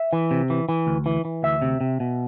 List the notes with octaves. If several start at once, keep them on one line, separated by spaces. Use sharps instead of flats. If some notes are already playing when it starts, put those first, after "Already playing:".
Already playing: E5
E3
C3
E3
E3
D2
E3
E3
D2 E5
C3
C3
B2